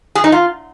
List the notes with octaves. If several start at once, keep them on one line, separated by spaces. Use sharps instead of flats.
G#4
D#4
F4